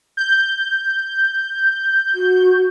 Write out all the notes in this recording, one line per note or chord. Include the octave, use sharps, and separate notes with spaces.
G6
F#4